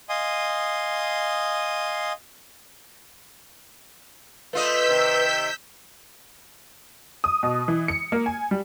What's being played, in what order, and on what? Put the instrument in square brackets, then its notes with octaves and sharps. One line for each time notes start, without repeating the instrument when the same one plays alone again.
[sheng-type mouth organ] D#5 F5 G#5 C6 D#6
[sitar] A3 F4 D#5 [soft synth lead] B4 [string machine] E6 G6 B6
[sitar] C3 D#3
[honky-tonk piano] D#6
B2
E3
C#7
A#3
G#5
G3